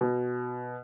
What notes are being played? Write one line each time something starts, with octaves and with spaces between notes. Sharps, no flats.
B2